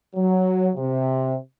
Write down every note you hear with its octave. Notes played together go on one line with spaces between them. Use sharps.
F#3
C3